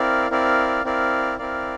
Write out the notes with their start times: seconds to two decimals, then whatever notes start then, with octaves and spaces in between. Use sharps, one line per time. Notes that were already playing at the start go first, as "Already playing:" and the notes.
Already playing: C4 E4 A#4 D5 F5
0.30 C4 E4 A#4 D5 F5
0.84 C4 E4 A#4 D5 F5
1.38 C4 E4 A#4 D5 F5